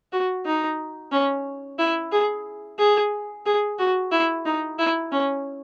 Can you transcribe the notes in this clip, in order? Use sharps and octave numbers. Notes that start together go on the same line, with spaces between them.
F#4
D#4
C#4
E4
G#4
G#4
G#4
F#4
E4
D#4
E4
C#4